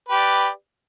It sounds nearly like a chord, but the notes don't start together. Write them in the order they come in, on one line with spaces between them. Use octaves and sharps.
B4 G4 D5